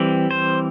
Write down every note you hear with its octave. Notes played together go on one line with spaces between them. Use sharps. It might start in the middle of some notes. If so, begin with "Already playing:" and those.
Already playing: E3 G3 C4
C5